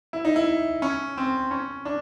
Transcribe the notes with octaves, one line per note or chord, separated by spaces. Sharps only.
E4
D#4
E4
C#4
C4
C#4
D4